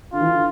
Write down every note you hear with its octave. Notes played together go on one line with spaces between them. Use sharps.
D3 F4
E3
D3